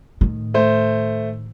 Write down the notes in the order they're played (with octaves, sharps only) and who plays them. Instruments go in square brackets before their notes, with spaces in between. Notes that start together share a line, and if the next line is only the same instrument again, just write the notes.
[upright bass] A2 D#3
[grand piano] A3 C5